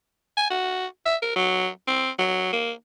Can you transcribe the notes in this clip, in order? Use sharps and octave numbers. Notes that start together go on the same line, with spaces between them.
G#5
F#4
E5
A#4
F#3
C4
F#3
A#3